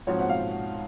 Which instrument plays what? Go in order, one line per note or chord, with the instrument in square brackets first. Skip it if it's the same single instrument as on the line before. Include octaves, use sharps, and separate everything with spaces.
[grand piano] G#2 F3 C4 F#4 [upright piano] C#5
[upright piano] F#5
F5